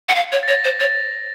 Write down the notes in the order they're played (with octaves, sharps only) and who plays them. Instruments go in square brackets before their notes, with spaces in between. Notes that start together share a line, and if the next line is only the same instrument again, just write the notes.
[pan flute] F#5
F5
C#5
[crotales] A6
[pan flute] C#5 [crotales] A#6
[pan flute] C5
[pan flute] C#5 [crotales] A6